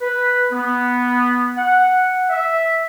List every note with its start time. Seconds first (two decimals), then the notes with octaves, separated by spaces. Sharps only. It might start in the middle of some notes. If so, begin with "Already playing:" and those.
0.01 B4
0.52 B3
1.57 F#5
2.30 E5